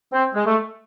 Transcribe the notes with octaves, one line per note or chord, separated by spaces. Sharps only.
C4
G#3
A3